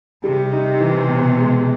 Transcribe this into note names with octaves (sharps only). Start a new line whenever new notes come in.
C3 G3
D#4
E3
B2
G#3